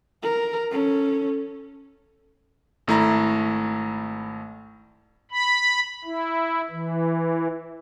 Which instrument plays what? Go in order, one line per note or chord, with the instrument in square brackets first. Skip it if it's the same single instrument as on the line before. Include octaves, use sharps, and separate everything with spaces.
[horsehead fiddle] A#4
C#4 A4
[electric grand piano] G#1 A3 E4 A#5
[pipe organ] B5
E4
E3